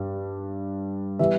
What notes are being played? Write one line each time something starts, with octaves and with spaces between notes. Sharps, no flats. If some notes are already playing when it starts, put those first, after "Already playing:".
Already playing: G2 G3
E3 G3 B3 E5